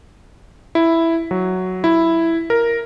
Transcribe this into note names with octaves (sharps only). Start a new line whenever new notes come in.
E4
F#3
E4
A#4